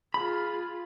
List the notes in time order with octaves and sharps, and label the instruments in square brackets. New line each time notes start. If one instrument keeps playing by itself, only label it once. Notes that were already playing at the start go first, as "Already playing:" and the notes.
[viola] F4 G#4 [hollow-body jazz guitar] B5